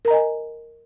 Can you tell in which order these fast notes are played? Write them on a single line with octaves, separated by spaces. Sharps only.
A#4 A#5 D#5 G#5